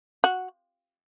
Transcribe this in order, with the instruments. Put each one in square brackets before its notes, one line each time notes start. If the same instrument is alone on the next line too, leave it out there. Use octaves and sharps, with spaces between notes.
[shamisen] F#4